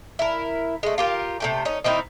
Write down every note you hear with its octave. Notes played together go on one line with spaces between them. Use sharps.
E4 A#4
G#3 A3
F4 G4 A#4
C3 A3 G5
C#4 D#4
D#3 C4 D#4 E4